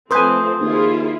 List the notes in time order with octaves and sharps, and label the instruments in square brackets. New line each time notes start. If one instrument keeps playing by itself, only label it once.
[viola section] F3 A3 C4 [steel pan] B4 G#5 [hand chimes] C6 D#6 G6
[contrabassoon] D#2 [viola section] E4 F4 G#4